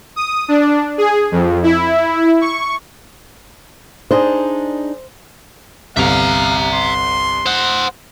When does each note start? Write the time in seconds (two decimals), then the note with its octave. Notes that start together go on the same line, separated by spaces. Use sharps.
0.16 D#6
0.48 D4
0.98 G#4
1.32 F2
1.63 E4
2.41 C#6
4.11 D4 D#4 G#4 C5
5.97 G1 C2 E5 F5 A#5
6.74 C6
7.46 C5 F#5